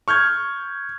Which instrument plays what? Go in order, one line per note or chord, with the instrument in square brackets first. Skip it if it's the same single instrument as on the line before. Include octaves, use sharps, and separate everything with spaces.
[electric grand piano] C#6 F6 G6 G#6